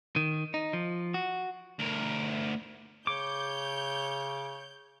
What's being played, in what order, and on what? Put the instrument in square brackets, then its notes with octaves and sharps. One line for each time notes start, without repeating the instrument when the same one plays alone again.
[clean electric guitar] D#3
D#4
F3
F#4
[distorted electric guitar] D2 A#4
[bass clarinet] C#3 [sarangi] C#5 [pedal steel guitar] D6 [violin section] G6